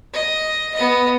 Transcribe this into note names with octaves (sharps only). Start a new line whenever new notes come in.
D#5
B3 D#5